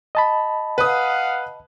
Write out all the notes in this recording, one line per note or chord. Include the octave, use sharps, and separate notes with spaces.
D#5 A5 B5
B4 F5 F#5 D#6